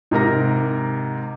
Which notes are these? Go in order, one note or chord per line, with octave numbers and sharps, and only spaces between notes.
G#2 C3 A#4 A#6